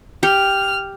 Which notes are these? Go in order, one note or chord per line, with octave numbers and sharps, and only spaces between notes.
G4 F6